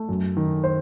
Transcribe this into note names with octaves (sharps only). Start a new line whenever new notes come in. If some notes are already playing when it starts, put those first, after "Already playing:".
Already playing: A3
F#2
D#3
C5